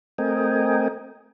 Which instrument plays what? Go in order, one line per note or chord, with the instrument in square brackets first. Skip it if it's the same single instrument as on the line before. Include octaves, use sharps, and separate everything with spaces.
[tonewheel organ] A3 C4 A#4 D#5 G5 G#5